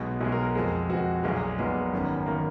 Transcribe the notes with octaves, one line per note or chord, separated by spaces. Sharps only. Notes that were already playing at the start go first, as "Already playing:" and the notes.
Already playing: B1 B2 G#3 F#4
B1 B2 G#3 G#4
A#4
A#4
F2 F3 G#3 G#4
F2 F3 G#3 F#4
B1 A#2 G#3 G#4
B1 A#2 G#3 B3
G#1 F#2 D#3
D#3 A#3